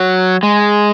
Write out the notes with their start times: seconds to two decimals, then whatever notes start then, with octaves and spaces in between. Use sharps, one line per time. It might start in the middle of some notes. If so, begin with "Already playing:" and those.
Already playing: F#3
0.43 G#3